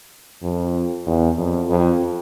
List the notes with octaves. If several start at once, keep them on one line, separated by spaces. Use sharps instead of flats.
F2
E2
F2
F2